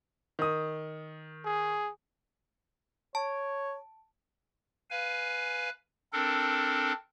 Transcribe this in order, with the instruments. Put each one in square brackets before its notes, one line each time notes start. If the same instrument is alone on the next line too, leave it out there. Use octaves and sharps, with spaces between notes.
[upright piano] D#3 D#6
[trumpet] G#4
[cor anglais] C#5 [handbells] A5
[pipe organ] B4 F5 G#5
C4 D4 A4 A#4